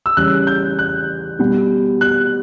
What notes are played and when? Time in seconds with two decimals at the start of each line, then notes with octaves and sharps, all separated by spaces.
0.06 E6
0.17 E2 C#3 G3 C#4 F#6
0.47 G6
0.79 F#6
1.39 B2 G3 B3
2.01 F#6